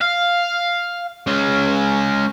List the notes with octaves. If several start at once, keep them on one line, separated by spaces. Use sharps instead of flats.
F5
G#3 C#4